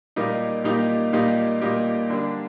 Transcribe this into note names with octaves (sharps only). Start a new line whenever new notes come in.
A#2 G3 A#3 D#4 G4
A#2 G3 A#3 D#4 G4
A#2 G3 A#3 D#4 G4
A#2 G3 A#3 D#4 G4
D3 G3 A#3 D4